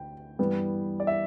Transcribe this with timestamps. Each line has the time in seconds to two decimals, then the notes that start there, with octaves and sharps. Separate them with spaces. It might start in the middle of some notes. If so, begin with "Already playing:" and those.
Already playing: D2 G5
0.39 G2 E3 G3 B3
1.00 D5
1.07 E5